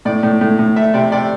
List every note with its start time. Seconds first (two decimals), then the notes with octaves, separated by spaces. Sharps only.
0.05 A2 D5
0.23 A2
0.41 A2
0.59 A2
0.76 A3 E5
0.94 C3 D5
1.12 C3 D5